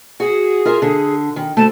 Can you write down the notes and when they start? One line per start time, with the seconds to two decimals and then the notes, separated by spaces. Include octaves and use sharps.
0.20 F#4 G#4
0.65 F4 A#4 E5
0.82 D3
1.36 D#3
1.57 D2 A3 A5